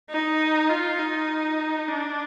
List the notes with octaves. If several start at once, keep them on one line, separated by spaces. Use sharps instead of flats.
D#4
F4
D#4
D4